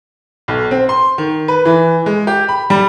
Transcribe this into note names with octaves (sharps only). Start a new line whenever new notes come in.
B1
C4
C6
D#3
B4
E3
G#3
G4
B5
G3